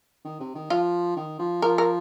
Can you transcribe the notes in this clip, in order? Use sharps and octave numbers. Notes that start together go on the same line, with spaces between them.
D#3
C3
D#3
F3 F4
D#3
F3
F3 A#4
A#4